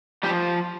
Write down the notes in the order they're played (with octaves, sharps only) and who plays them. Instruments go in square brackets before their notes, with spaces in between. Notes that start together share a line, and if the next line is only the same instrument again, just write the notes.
[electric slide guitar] F3 G3 G4